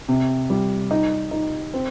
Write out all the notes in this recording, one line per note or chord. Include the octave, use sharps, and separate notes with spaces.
C3
G3
D#4
D#4
C4